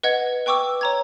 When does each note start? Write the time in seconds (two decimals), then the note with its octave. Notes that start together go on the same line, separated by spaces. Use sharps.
0.03 B4 D#5 F#5 G#6
0.46 B4 G5 C#6 D6 E6
0.81 C#5 A#5 G#6